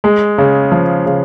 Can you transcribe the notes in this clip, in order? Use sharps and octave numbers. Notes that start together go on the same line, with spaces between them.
G#3
C#3
F3
C#3